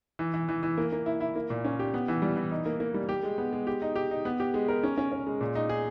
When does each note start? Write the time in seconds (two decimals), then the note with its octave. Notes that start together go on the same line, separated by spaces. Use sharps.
0.19 E3
0.34 E3
0.49 E3
0.63 E3
0.78 A#3
0.92 A#3
1.06 E4
1.21 E4
1.36 A#3
1.50 A#2
1.65 C#4
1.79 G4
1.94 B3
2.08 E3
2.22 G3
2.37 E3
2.51 D#4
2.66 A#3
2.80 A#3
2.94 G3
3.09 G4
3.23 G#3
3.38 B3
3.53 G#3
3.67 G4
3.82 D#4
3.96 G4
4.11 D#4
4.25 B3
4.40 G4
4.54 G#3
4.68 A#4
4.83 C#4
4.97 C#4
5.12 C#4
5.27 G#3
5.41 A#2
5.55 D#4
5.69 G#4